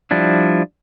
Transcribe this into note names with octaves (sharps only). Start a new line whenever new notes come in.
F3 G3 D4 E4